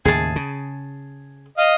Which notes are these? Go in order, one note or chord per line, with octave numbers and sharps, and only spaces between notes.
D#2 A2 C#3 G#4 A5
C#3
D#5 F5